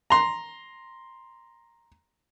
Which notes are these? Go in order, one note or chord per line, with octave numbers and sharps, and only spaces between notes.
A#5 C6